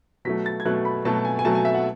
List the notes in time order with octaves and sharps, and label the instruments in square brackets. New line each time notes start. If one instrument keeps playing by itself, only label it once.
[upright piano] B2 F#3 A3 B6
A6
G#6
B2 F#3 A3 F#6
B5
B2 F#3 A3 A5
G#5
G#5
B2 F#3 A3 A5
G#5
E5
F#5